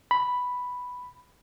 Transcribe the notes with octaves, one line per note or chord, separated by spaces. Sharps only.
B5